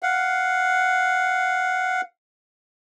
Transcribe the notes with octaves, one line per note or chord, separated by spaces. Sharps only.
F5 F#5